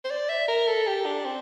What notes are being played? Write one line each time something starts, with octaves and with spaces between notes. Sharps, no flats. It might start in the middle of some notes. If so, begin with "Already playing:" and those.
C5
D5
E5
A#4
A4
G4
D4
C4